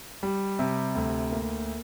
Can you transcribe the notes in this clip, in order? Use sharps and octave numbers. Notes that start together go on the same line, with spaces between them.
G3
C3
D2
A#3